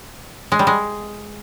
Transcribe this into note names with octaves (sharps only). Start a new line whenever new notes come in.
G#3
G3
G#3